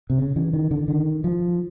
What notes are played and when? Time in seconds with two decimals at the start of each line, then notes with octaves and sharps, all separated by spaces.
0.10 C3
0.19 C#3
0.36 E3
0.53 D#3
0.71 D3
0.88 D#3
1.24 F3